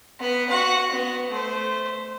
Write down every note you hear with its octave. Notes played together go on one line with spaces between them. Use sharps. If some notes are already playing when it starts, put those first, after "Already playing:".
B3 B4
F#4 F#5
B3
A3 C5